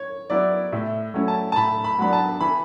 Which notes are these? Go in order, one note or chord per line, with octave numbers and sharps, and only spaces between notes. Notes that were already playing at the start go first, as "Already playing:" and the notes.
Already playing: C#5
F#3 B3 E4 D5
A2 E5
F#3 A3 C#4 E4
A5
A5
A2 B5
B5
F#3 B3 D4 B5
A5
E3 B5